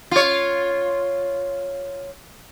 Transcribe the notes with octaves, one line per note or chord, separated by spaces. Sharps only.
F4 C#5